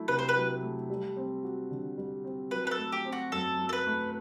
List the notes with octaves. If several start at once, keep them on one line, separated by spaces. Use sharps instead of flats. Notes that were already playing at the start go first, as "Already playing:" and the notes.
Already playing: F#3 A3 E4
C3 B4
C5
B4
F#3
A3
G3
C4
F#4
D3
G3
C4
F#3 B4
B4
A4
A3
G4
C4
F#4
F#2 A4
F#3
A4
B4
A3